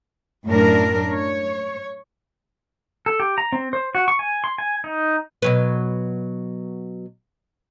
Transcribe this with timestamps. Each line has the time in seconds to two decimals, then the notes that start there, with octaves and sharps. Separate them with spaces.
0.48 F#2 A2 D4 A#4
1.12 C#5
3.06 A4
3.20 G4
3.38 A#5
3.52 C4
3.73 C5
3.95 F#4
4.08 C#6
4.19 G#5
4.44 C6
4.58 G#5
4.84 D#4
5.42 B2 F#3 B4